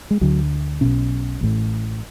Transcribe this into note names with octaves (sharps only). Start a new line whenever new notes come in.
G#3
D2 D3 F#3
B1 B2 C#4
A1 A2